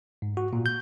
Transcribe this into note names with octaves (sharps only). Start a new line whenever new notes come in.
G#2
F#4
A#2
G6